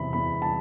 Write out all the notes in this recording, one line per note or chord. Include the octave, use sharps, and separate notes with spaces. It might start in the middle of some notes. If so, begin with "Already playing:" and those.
Already playing: E2 C3 E3 B5
E2 B5
A5